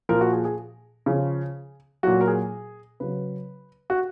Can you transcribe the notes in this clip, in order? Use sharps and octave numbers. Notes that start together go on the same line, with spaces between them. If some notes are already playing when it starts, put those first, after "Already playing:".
A#2 F3 A#4
F#4
G#4
G#4
C#3 F3 G#4
A#2 F#3 F#4
A#4
G#4
C#3 F#3 B4
F#4